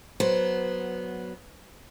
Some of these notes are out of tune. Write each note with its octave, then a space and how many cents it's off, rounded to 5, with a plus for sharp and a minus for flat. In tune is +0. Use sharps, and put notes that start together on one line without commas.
F#3 +0 B3 -10 C5 +0